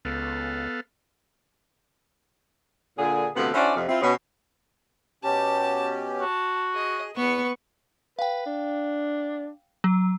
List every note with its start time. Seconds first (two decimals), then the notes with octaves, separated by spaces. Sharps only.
0.05 C#2 B3 A4 F5
2.98 A#2 D3 G#4
3.36 D2 C3 F3 B3 A4 F#5
3.54 C#4 D4 E4 F#4 C5 D5
3.76 F2 C3
3.89 C4 E4 F4
4.02 B2 C#4
5.24 B2 C#4 G4 A5
6.21 F#4 A5
6.75 G#4 D#5
7.16 E2 B3 B4 C#6
8.19 B4 F5 G5
8.46 D4
9.84 F#3